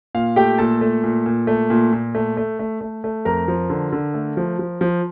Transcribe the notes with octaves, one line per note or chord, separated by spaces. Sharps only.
A#2 F5
A3 G4 G5
A#2 A4 A5
A3
A#2
A#2
A3
A#2
A#2
A3
A3
A3
A3
A3
F2 A#4 A#5
F3
D3
D3
A3
F3
F3
F3